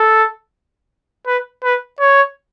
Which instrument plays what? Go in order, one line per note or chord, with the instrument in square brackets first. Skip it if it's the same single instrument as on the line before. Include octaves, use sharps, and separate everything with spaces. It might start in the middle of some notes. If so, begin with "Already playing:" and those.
Already playing: [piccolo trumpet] A4
B4
B4
C#5